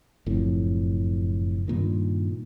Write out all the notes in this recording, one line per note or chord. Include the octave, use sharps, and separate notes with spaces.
F#1 F2 A2
G2 A#2 D#3